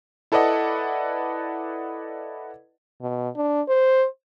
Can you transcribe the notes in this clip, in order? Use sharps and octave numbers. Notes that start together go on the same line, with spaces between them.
E4 A4 B4 D5 D#5 F#5
B2
D4
C5